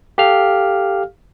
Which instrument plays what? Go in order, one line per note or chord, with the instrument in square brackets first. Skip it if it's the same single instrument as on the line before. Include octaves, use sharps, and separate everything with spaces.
[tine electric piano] G4 A4 F5 F6